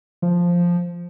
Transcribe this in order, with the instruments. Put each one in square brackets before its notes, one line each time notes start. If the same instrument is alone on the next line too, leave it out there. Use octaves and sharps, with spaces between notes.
[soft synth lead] F3